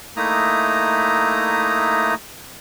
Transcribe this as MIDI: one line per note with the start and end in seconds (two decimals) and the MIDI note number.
0.17 2.15 57
0.17 2.15 58
0.17 2.15 63
0.17 2.15 64
0.17 2.15 82
0.17 2.15 87